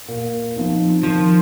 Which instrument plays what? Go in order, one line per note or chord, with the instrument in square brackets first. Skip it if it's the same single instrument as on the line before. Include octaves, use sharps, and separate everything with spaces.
[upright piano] A#2
F3 C4 D#4
[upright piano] D#3 [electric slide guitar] F3